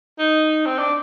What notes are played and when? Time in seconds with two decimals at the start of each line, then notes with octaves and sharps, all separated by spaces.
0.19 D#4
0.66 C4
0.79 D4